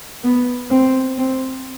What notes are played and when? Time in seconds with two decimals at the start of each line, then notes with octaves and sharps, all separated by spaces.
0.24 B3
0.70 C4
1.18 C4